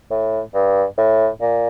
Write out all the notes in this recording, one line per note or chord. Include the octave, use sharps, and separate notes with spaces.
A2
G2
A2
A#2